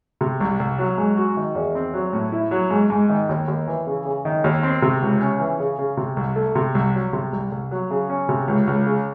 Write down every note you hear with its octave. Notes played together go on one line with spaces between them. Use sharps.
C3
C2
C2
F#3
G#2
F#4
D#3
E2
C4
F#3
A2
E4
F#3
G#2
G#2
D#3
D#2
D#2
E3
C#3
C#3
D#3
D#2
C4
C3
C#2
C#4
E3
C#3
C#3
C3
C2
A3
C3
C2
F#3
C3
C2
C2
F#3
C#3
C#4
C3
C#2
C#2
C#3